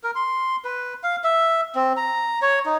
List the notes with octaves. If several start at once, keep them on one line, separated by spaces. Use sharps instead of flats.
A#4
C6
B4
F5
E5
C4
A#5
C#5
D#4